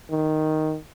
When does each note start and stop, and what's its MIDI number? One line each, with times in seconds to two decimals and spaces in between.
0.10 0.76 51